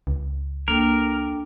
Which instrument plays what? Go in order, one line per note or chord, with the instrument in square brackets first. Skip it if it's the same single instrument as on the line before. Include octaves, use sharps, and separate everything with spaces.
[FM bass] C#2
[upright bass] A#3 [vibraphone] D4 A4 G5 [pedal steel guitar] A#4